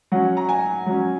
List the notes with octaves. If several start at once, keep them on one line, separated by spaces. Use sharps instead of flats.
F#3 C#4 F#5
A#5
G#5
F#3 C#4